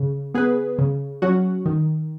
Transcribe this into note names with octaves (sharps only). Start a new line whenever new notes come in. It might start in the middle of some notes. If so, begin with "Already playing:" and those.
Already playing: C#3
B3 G#4 B4
C#3
F#3 C#4 F#4
D#3